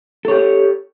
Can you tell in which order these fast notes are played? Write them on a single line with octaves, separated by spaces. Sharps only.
A4 C#5 G4